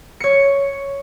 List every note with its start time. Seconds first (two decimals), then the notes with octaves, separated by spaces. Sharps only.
0.20 C#5 C#7